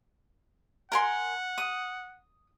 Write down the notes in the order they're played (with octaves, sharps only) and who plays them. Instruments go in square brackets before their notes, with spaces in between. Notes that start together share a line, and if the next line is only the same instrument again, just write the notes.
[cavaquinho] A#4 G#5 C6 [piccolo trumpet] F#5
[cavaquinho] D#6